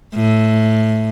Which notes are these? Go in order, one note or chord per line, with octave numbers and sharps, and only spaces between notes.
A2